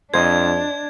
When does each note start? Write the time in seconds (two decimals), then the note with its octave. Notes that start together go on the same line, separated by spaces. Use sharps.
0.14 F2 D4 C5 D#5 G#6